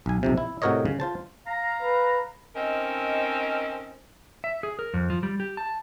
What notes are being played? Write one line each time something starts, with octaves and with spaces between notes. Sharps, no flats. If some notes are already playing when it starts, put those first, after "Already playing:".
B1 G#5
B1 F2 C3
E4
A2 C3 F#4 A#4 C#5 D#5
C#3
F4 C5 A5
F5 A#5
B4
C4 C#4 D#4 A4 A#4 D#5
E5
G#4
A#4
F2
F3
G3
G4
A5